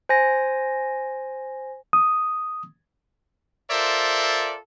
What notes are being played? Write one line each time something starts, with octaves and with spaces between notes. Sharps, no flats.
C5 G#5 A#6
D#6
F4 A4 A#4 C5 D5 E5